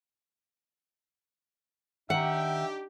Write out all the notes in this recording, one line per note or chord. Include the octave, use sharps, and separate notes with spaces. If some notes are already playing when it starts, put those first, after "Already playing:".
D#3 D4 D#4 G4 E5 F#5 G5 A#5